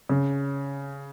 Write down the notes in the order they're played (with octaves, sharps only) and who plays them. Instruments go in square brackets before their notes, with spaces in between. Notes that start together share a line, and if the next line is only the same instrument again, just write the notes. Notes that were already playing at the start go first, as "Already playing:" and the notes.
[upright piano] C#3